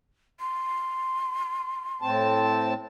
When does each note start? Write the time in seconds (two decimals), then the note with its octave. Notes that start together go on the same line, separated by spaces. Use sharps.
0.40 C6
2.02 A2 C4 A5